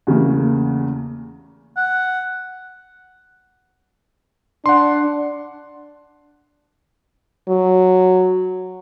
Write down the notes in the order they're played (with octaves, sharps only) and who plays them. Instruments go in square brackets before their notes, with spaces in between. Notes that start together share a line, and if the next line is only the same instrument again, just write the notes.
[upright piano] E2 C#3 A3 A#3
[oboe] F#5
[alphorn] D4 [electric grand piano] F#5 C6
[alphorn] F#3